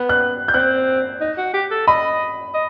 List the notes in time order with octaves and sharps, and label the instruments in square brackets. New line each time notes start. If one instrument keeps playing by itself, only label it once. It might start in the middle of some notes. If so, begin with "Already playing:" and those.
Already playing: [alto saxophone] B3
[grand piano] F#6
G6
[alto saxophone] C4 [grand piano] F#6
[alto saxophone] D#4
F#4
G4
A4
[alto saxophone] D#5 [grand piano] B5
[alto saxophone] D#5